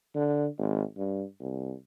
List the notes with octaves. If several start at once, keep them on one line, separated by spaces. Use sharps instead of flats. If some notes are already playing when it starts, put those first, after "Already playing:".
D3
G#1
G2
C2